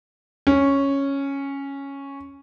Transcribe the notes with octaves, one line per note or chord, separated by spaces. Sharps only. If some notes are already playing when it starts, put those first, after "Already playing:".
C#4